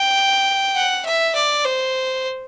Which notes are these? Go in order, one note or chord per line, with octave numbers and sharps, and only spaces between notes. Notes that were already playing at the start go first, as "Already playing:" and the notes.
Already playing: G5
F#5
E5
D5
C5